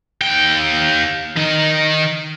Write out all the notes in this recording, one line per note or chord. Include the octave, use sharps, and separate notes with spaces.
D#2 G5
D#3 D#4